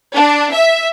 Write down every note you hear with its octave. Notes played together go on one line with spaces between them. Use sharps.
D4
E5